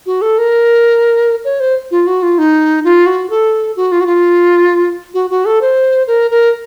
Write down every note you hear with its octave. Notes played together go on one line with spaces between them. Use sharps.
F#4
A4
A#4
C#5
C5
F4
F#4
F4
D#4
F4
F#4
A4
F#4
F4
F#4
F4
F#4
F#4
A4
C5
A#4
A#4